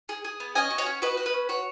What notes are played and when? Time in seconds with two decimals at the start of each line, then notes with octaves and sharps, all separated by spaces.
0.09 G#4
0.24 G#4
0.40 B3
0.55 C#4 D#5 G#5
0.71 F#4
0.78 C#5 F#5
0.86 C#4
1.02 F#4 B4 D#5
1.17 F#4
1.26 B4
1.34 C#4
1.49 F#4 C#5